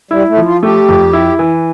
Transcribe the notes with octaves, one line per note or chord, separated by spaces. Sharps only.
G3 E4
A3
F3
F4
A3 G4
F2
E4
E3